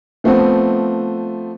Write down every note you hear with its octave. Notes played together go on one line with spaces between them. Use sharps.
F3 A3 B3 C4